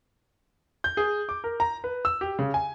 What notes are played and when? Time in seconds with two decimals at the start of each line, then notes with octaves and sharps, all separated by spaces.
0.84 G6
0.97 G#4
1.29 D6
1.44 A#4
1.60 A#5
1.84 B4
2.05 E6
2.21 G4
2.39 C#3
2.54 G#5